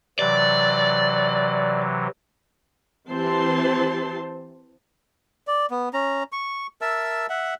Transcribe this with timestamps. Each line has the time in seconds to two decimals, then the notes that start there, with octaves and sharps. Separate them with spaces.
0.19 C3 E3 F#3 D5
3.12 E3 C4 G4 C5 A5 C6
5.47 D5
5.70 B3
5.94 C#4 A#5
6.32 C#6
6.81 A#4 E5 A5 E6
7.29 E5 F#5